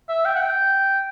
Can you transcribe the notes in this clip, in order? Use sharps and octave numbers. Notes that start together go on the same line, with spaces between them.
E5
G5
F#5
G5